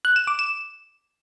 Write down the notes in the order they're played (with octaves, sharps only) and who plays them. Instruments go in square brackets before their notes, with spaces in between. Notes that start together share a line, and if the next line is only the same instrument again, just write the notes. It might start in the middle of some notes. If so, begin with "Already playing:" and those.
[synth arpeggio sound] F#6
E7
D6
E7